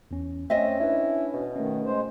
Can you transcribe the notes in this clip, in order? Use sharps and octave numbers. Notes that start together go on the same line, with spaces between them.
E2 C#4
A3 C4 C#4 D#5 E5
D4 E4 B4
B2
D#3 A3 C#4
G#3 C5